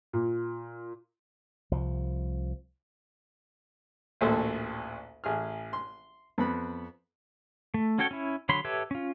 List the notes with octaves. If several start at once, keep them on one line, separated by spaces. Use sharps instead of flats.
A#2
C2 F3
A1 D2 A#2 A4 C5
A1 G#4 F6
C6
F2 B3 B5
A3
C#4 F#4 A4 C#5 G5
C#4 E4
D3 F#3 C#5 B5 C6
G4 A4 B4 C#5 E5
C#4 F4